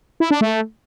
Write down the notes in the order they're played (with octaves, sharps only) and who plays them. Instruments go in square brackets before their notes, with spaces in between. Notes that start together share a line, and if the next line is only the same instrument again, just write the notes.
[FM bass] E4
D4
A3